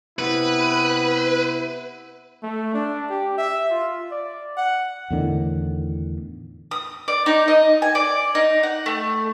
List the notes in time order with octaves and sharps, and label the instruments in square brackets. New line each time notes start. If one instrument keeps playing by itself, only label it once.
[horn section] C3 B3 E4 [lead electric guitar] B4
[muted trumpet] A3
D4
G4
E5
F4
D5
F#5
[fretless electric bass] E2 A2 D3 D#3
[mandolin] D#6
D5
D#4
D#5
G#5
D5
D#4
F#5
A3